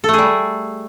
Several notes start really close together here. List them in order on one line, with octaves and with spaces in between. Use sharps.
A4 A3 G#4 G3